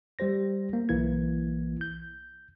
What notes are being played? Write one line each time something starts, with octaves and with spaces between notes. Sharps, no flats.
G3 G4 C5 A#6
A#3
B1 E3 A#3 E4 G#6
G6